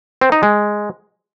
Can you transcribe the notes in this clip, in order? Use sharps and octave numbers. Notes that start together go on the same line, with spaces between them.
C4
D#4
G#3